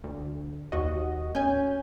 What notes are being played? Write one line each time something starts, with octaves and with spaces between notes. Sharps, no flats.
D2
D#2 F#4 D#5
C#4 G#5 G6